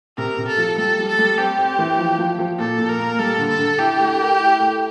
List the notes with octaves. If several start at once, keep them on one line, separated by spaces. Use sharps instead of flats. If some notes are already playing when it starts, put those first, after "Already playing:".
C3 A#4
C3
A4
F3
G3 A4
G3
A4
G3
C4 G4
C4
E3
F3
F3
F3
A#2 A4
A#2
A#4
A#3
G3 A4
D3
A4
D3
E4 G4
A3
A#4
E4
A3